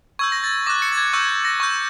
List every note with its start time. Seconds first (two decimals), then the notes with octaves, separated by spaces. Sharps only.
0.19 C#6 E6 G6 G#6
0.32 A#6
0.44 A6
0.66 D6 F#6 A#6
0.82 C#7
0.92 A6
0.97 G#6
1.13 C#6 E6 G6
1.29 G#6
1.45 A#6
1.60 C#6 E6 G6